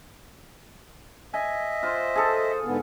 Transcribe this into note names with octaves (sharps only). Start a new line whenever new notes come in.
D#5 E5 G#5
F4 C5
G#4 A4
G#2 D3 B3